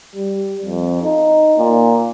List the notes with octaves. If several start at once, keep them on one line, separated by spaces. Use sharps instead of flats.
G3
F2
D#4
A#2